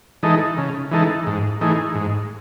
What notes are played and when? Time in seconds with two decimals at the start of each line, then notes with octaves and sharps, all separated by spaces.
0.23 E3 G#3 D#4 A4
0.58 C#3
0.91 E3 G#3 D#4 A4
1.27 G#2
1.61 E3 A3 D#4 G#4
1.95 G#2